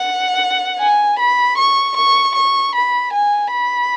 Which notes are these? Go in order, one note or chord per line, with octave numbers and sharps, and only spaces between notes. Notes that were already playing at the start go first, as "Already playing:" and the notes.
Already playing: F#5
G#5
B5
C#6
C#6
C#6
B5
G#5
B5